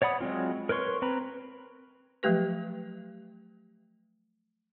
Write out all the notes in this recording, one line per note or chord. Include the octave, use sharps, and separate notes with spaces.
C#5 D5 F#5 B5 D#6
F#3 G#3 C4 F4
A#4 B4 C#5 C6 C#6
C4 B4 A#5 B5
F3 F#3 A3 G4 B4